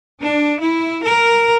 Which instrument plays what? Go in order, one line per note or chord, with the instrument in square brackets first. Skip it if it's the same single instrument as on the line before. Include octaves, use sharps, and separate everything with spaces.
[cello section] D4
E4
A#4